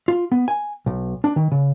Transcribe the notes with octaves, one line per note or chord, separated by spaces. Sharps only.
F4
B3
G#5
B1
D4
D#3
C#3